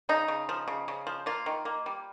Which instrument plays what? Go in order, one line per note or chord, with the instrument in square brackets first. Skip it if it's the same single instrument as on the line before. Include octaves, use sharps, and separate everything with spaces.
[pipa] C#3 D#4
C#3
F3
C#3
C#3
F3
A#3 F4
D#3
A#3
G3